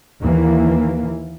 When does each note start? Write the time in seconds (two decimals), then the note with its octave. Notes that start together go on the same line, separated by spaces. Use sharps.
0.21 D#2 E3 A#3